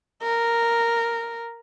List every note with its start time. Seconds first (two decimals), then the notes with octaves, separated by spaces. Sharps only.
0.23 A#4